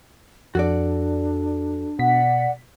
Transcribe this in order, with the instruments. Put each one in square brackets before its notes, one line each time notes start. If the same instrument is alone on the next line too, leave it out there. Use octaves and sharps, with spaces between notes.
[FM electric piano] F2 [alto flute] D4 [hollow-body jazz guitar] F#4 A4 D5
[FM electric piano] B2 B6 [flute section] D5 F#5